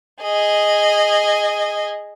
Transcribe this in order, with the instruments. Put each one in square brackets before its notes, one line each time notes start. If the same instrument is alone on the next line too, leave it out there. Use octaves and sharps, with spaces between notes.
[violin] G#4 D#5